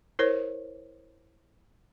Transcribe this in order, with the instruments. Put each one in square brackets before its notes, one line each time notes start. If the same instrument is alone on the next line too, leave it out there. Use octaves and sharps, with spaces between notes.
[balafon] E4 A#4 C5 C#5